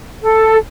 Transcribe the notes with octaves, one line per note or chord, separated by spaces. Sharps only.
A4